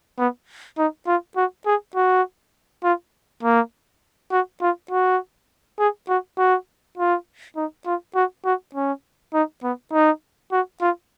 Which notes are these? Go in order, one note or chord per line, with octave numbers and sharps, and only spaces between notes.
B3
D#4
F4
F#4
G#4
F#4
F4
A#3
F#4
F4
F#4
G#4
F#4
F#4
F4
D#4
F4
F#4
F#4
C#4
D#4
B3
D#4
F#4
F4